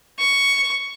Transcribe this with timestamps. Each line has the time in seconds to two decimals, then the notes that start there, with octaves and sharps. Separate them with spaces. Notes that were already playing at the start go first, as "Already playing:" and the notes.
0.19 C#6